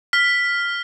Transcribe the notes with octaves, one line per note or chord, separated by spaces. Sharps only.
F6 B6